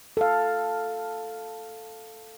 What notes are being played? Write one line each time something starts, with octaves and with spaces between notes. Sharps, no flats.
A4 F5